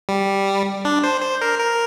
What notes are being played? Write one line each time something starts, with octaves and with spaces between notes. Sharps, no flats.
G3
D4
C5
C5
A#4
A#4